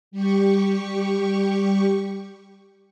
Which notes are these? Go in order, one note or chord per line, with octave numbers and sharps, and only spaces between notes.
G3 G4 C#6